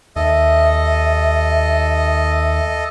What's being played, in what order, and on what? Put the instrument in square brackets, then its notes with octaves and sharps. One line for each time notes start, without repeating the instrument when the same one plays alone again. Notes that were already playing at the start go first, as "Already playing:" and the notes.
[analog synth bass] D#2 [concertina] A4 D#5 [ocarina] E5